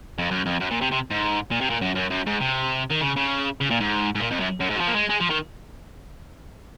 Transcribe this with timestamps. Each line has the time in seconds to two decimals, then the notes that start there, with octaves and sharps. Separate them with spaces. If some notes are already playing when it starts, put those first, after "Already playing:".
0.18 F2
0.31 F#2
0.46 F2
0.60 F#2
0.71 A#2
0.81 C3
0.91 C3
1.10 G#2
1.51 A#2
1.61 C3
1.70 A#2
1.81 F#2
1.95 F#2
2.10 F#2
2.26 G#2
2.40 C3
2.90 D#3
3.01 C#3
3.16 C#3
3.61 C#3
3.70 A#2
3.80 G#2
4.15 G#2
4.20 A#2
4.31 F2
4.40 F#2
4.61 F#2
4.70 G#2
4.76 F#3
4.81 F3
4.88 A#3
4.96 G#3
5.10 G#3
5.21 F3
5.30 D#3